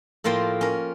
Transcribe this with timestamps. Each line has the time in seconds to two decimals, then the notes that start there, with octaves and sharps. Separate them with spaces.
0.24 A2 F3 A#3 F4 C5 G5
0.61 C#4 A#4